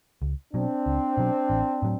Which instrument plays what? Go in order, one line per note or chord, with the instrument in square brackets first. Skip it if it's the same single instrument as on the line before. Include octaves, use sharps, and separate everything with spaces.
[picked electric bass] C#2
[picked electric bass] B2 F#3 [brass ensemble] C4 D4
[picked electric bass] C#2
B2 F#3
A1
A2 F#3